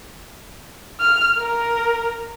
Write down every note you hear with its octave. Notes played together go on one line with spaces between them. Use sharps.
F6
A#4